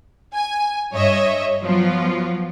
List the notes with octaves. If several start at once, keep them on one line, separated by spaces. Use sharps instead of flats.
G#5
G2 C#5 D#5 E5
F3 F#3 B3 F4